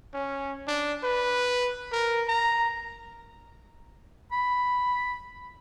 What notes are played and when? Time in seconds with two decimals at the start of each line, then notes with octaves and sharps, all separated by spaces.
0.14 C#4
0.67 D4
1.03 B4
1.92 A#4
2.28 A#5
4.32 B5